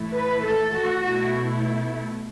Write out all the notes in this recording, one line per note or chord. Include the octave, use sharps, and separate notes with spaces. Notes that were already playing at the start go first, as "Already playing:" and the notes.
Already playing: A2 E3 A3 E4
B4
A4
F#4
B2 A3 E4 F#4